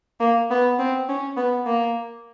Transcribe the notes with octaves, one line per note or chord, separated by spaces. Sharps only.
A#3
B3
C4
C#4
B3
A#3